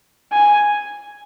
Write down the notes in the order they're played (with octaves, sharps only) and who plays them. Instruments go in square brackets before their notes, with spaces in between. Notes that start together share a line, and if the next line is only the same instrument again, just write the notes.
[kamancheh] G#5